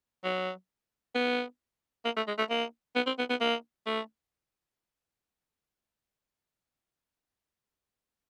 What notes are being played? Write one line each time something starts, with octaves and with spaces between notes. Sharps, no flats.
F#3
B3
A#3
A3
G#3
A3
A#3
B3
C4
B3
B3
A#3
A3